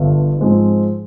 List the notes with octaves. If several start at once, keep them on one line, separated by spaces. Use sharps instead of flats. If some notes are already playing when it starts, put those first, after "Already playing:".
Already playing: G1 G2 D3
G#2 F3 G#3 C4